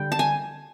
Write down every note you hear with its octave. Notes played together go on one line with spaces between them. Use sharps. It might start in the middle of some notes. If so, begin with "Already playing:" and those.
Already playing: D3 G3 G5
A5
G#5